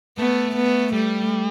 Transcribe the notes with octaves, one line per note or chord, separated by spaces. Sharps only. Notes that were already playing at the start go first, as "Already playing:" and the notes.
A3 B3
B3
G3 A3